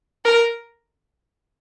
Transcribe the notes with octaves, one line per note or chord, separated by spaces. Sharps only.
A#4